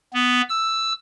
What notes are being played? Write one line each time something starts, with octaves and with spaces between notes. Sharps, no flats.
B3
E6